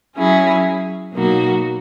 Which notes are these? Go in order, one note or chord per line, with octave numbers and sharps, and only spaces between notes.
F#3 C#4 E4 G#4
B2 F#3 A#3 D#4 F#4